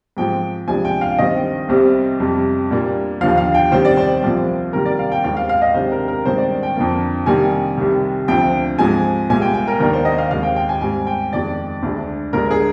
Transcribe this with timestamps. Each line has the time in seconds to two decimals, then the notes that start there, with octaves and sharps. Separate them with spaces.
0.17 G#2 F3 G#3 C4 G5
0.68 D2 C3 F3 G#3 D4 G#5
0.85 G5
1.01 F5
1.18 G2 D#3 G3 C4 D#5
1.69 C2 C3 G3 C4
2.20 F2 C3 G3
2.71 A#2 G3 A#3 D4
3.21 D#2 D3 F3 F5
3.38 F5
3.54 G5
3.72 C3 D#3 G3 C5
3.85 D5
3.97 C5
4.23 C2 A#2 F3 C4
4.73 C3 D#3 G3 A#3 A#4
4.85 D5
4.99 F5
5.12 G5
5.24 D#2 D#3 G#3 C4 F5
5.37 F5
5.49 F5
5.62 D#5
5.74 C3 D#3 G#3 D4 C5
5.92 A#4
6.08 A#4
6.25 G2 D#3 G#3 C4 C5
6.38 D5
6.63 G5
6.76 F2 D3 F3 A#3
7.26 C3 D#3 G3 A#3 D4 G#5
7.77 C2 C3 D#3
8.28 D2 D3 F3 C4 G5
8.78 G#2 F3 G#3 C4 G#5
9.29 C2 A#2 G#3 G#5
9.42 G5
9.54 G5
9.67 A#4
9.80 D#2 D#3 A#3 D4 A#4
9.93 C5
10.05 D#5
10.18 F5
10.31 D#2 D#3 G#3 C4 F5
10.43 G5
10.56 G5
10.69 G#5
10.81 G#2 G3 C4 G#5
11.07 G5
11.32 F2 D#3 G#3 D5
11.83 D2 D3 G#3 D4
12.33 D2 D3 G#3 D4 A#4
12.51 G#4